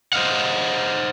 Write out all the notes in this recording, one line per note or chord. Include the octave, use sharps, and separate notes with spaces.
C5 D#5 F5 F#5